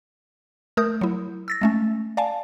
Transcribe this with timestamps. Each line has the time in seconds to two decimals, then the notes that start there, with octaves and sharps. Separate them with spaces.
0.77 A3 A#4 D#6 G6
1.01 F#3 E4
1.48 E6 A6 A#6
1.61 G#3 A3 C#4
2.17 D5 F5 G#5 A5